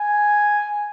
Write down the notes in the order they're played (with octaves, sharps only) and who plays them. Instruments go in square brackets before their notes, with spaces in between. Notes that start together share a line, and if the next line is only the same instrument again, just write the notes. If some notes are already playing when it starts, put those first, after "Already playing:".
Already playing: [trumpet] G#5